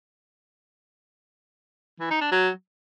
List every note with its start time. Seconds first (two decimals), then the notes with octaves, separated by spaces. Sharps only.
2.00 E3
2.10 D#4
2.21 D4
2.32 F#3